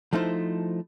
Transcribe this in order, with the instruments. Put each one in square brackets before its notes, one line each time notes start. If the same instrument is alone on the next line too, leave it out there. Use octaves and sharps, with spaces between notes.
[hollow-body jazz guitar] F3 A3 D#4 E4 C5